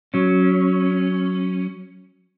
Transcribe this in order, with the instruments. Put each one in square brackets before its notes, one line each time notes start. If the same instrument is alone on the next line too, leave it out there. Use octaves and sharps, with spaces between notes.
[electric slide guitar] F#3 C#4